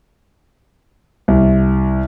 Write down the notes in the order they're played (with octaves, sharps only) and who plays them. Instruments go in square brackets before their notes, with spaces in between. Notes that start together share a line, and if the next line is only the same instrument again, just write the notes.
[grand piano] C2